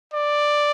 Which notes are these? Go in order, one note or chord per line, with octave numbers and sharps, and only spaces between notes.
D5